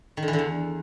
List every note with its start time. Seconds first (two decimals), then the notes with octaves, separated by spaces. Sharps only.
0.17 D#3
0.23 D3
0.28 E3
0.33 D3
0.39 E2